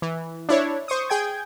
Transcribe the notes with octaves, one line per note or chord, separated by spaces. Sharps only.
E3
D4 E4 C#5
C5 C#6 D#6
G#4 G5 G#6